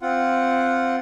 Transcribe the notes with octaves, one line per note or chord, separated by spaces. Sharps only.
C4 F4 F#5